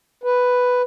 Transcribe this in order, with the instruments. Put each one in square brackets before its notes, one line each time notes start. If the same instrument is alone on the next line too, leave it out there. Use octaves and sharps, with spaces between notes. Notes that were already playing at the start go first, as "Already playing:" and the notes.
[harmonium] B4